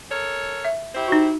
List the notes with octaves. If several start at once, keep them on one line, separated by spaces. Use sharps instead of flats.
A4 A#4 C#5
E5
E4 G4 C5
D#4 F#4